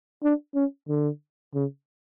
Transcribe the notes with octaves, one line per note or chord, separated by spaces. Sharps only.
D4
C#4
D3
C#3